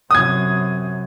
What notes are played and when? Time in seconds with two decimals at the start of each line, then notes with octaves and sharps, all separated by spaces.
0.11 F#2 C3 D#6 G#6